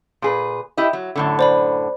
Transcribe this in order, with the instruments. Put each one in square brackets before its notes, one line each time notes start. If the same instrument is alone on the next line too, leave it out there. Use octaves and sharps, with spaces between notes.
[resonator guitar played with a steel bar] A#2 G#4 B4
E4 G4 D#5
F#3
F#2 A2 D3
[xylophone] C5 D5 B5